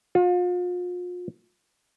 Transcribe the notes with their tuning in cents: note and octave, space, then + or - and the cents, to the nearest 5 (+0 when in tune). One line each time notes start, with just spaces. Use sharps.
F4 +35